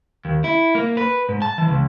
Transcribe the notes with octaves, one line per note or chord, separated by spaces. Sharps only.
D#2
E4
A#3
B4
G#2
A5
E3
C#2